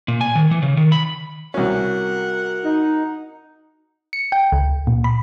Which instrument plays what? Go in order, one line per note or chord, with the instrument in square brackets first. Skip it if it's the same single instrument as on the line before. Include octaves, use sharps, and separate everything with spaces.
[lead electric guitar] A#2
G#5
D#3
E3
C#3
D#3
B5
[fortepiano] C2 C#4 [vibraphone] F#4 [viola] A#4 F#5
[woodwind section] D#4
[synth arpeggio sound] C#7
G5
C#2
A#2
B5